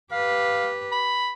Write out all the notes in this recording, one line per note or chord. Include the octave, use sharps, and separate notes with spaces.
G4 B4 F5
B5